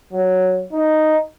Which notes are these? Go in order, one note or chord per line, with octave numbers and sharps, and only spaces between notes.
F#3
D#4